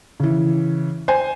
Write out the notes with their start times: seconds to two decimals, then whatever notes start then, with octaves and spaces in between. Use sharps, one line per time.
0.20 C#3 E3
1.08 C5 G#5